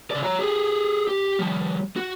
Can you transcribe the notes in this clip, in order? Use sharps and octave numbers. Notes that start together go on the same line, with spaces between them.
C#3 D5
C#5 A#5
G4 G#4
G4
F3 G3
F#4